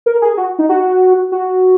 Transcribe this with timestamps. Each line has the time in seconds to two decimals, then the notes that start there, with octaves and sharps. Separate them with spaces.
0.06 A#4
0.22 G#4
0.37 F#4
0.59 D#4
0.69 F#4
1.32 F#4